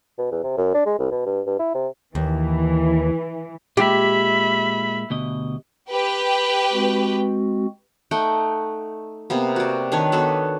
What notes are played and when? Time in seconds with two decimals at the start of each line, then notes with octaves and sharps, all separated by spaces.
0.18 B2
0.31 E2
0.44 C3
0.57 F#2
0.74 D4
0.86 G#3
0.99 C2
1.11 B2
1.26 G2
1.47 G2
1.59 E4
1.74 C3
2.15 D#2 E3
3.77 A#2 G#3 G4 E5 B5
5.10 D2 B2 D#5
5.90 G4 B4 G5
6.72 G#3 C4 F#4
8.11 A3 D#4 F#5 G5
9.30 C3 A#3 B3
9.56 F#4 D5
9.92 D#3 D4 B4 C#5
10.12 B3 F#4 A4 B4